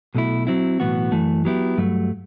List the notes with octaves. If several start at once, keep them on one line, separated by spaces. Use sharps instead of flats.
B1 B2 A3 E4
F#3 C4 E4
B1 A2 E3 B3 F#4
F#2 E3 A3
F#3 B3 E4 G4
G2 F#3 A3